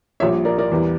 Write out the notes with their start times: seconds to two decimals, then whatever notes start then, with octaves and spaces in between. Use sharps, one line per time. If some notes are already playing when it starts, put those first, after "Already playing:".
0.20 A#1 A#2 G3 C#5 E5
0.45 A#4 D5
0.58 A#4 D5
0.71 E2 E3 G3